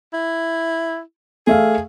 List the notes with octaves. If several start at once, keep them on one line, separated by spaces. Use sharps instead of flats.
E4
A3 G#4 E5 F5